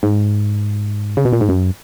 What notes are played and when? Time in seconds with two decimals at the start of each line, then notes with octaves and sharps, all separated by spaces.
0.03 G#2
1.17 C#3
1.25 B2
1.33 A#2
1.41 G#2
1.49 F#2